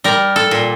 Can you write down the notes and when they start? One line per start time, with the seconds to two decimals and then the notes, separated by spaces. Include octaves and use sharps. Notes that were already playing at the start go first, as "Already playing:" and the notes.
0.04 G3 A#4
0.36 A4
0.51 A#2